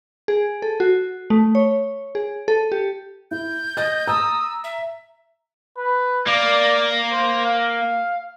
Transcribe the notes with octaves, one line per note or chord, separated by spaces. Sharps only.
G#4
A4
F#4
A3
C#5
G#4
A4
G4
E4 G6
D#5 A6
A#5 D#6 E6
E5
B4
A#3 D5
C5
F5